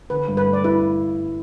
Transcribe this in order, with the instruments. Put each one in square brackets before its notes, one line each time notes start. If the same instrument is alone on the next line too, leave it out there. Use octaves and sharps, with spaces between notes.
[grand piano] D3 [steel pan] B4
[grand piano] G2
[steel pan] B4
[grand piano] A3
[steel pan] D5
[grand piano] E4 [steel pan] B4